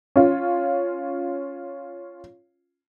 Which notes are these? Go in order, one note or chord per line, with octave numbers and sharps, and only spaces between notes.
C#4 F4